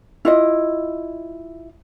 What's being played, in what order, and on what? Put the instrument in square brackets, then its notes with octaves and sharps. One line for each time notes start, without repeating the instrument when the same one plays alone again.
[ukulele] E4 F4 D#5